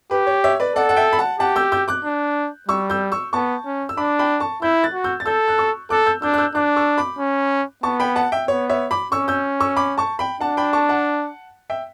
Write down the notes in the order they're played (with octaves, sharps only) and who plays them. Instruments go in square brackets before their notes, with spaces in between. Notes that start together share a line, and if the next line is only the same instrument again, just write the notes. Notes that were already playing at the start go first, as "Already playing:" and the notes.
[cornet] G4 [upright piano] B4
[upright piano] C#5
C#5 E5
B4 D5
[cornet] A4 [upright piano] D5 F#5
[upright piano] F#5
E5 G5
B5
F#5 A5
[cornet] G4 [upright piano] F#5 A5
[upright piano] E6 G6
E6 G6
D6 F#6
[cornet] D4
[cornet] G3 [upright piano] C#6 E6
[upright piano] E6 G6
C#6 E6
[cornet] B3 [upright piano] A5 C#6
[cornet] C#4
[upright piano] E6
[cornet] D4 [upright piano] B5 D6
[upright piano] G5 B5
A5 C#6
[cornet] E4 [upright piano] E6 G6
[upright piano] F#6 A6
[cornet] F#4
[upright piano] E6 G6
A6
[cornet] A4 [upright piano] E6 G6
[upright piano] F#6
C#6 E6
[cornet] A4 [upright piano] D6 F#6
[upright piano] E6 G6
[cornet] D4 [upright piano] E6 G6
[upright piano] F#6
E6 G6
[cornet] D4 [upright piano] D6 F#6
[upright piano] C#6 E6
B5 D6
[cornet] C#4
[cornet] B3 [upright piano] A5 C#6
[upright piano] G5 B5
F#5 A5
E5 G5
[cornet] B3 [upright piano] C#5
[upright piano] C#5 E5
B5 D6
[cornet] C#4 [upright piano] C#6 E6
[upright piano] E6 G6
C#6 E6
B5 D6
A5 C#6
G5 B5
[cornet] D4 [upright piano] F#5 A5
[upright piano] G5 B5
A5 C#6
F#5 A5
E5 G5